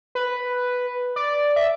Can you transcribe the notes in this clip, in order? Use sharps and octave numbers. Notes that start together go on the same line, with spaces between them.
B4
D5
E5